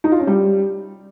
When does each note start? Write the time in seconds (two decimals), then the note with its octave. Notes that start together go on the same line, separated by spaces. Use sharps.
0.04 D#4
0.12 F4
0.20 C#4
0.27 G3